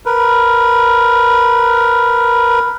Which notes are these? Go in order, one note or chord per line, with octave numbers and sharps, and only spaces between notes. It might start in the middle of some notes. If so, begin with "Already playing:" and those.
A#4 B4